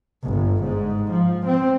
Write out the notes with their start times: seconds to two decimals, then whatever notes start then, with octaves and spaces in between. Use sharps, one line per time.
0.24 G1
0.63 G#2
1.11 F3
1.45 C4